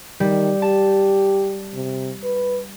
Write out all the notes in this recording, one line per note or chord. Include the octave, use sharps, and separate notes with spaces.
D#3 G3
G4 A5
C3
B4